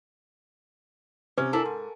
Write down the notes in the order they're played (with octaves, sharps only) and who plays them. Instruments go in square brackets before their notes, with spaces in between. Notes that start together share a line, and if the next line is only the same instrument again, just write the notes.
[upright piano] C3 [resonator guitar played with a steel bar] C#4
[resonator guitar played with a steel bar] D4 E4 A5 [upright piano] A4 A#4 G#5
[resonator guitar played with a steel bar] G#2